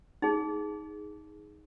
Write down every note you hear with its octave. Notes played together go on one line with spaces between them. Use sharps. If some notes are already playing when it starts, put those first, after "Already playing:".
D#4 G#4